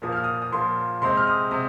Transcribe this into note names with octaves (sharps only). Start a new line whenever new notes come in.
A#2 F3 A#3 D#6
F6
D#6
D#6
A#2 F3 A#3 C6
C3 G#3 C4 C6
F6
D#6
C3 D#6